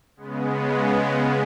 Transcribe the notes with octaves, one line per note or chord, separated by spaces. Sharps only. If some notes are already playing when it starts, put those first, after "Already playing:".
C#3 G#3 B3